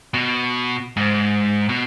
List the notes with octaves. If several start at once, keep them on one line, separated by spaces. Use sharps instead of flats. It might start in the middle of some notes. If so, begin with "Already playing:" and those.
B2
G#2
B2